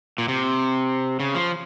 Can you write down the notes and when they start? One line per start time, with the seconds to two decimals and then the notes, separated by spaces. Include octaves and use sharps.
0.18 A#2
0.28 C3
1.20 C#3
1.35 F3